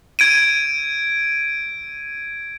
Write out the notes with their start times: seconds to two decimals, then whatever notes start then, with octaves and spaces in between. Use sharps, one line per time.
0.19 G#6 D7 D#7